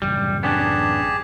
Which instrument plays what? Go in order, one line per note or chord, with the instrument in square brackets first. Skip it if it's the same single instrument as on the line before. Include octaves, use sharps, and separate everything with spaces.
[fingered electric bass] A1 F#2 C#3 [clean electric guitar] G3
[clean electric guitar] B3 C#4 D4 [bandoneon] G4 G#4 A5